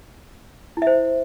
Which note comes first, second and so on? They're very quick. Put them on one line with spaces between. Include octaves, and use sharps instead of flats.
E4 E5 C5